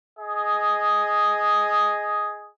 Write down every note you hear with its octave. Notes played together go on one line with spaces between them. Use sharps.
G#4 D#5